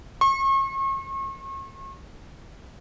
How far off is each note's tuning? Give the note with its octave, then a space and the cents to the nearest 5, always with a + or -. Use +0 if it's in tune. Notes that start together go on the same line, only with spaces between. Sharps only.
C#6 -40